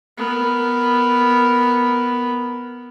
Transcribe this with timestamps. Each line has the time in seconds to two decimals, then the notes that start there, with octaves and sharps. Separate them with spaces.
0.17 B3 A#4